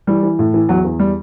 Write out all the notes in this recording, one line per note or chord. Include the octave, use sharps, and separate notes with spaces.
E3 G3
E3
A2
E3
E2 F#3
E2
G3